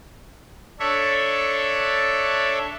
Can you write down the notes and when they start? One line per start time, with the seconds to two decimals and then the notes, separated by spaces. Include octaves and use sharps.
0.80 D4 A4 C#5 E5